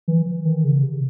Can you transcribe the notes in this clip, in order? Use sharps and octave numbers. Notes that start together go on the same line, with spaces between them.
E3
E3
D#3
C#3
C3